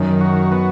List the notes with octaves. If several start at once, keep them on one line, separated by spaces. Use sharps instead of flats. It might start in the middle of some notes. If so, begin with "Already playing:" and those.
Already playing: F#2 D#3
F#4
B3